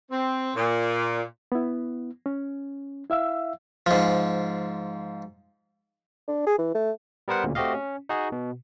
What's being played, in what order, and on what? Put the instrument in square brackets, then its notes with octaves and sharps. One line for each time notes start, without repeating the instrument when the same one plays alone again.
[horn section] C4
A#2
[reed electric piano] B3 E4
C#4
E4 E5 F5 E6
[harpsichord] G#2 F3
[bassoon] D4
G#4
E3
A3
[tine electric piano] G3 B3 A#4 C5 F#5
D2 A#2 C#3
A3 C4 F#4 G4 D#5 F5
C#4
D#4 F#4 G#4
B2